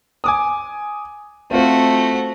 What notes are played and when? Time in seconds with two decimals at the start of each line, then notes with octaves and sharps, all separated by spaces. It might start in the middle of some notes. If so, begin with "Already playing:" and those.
0.24 G#5 D6 D#6
1.51 A3 C4 F4 F#4 C5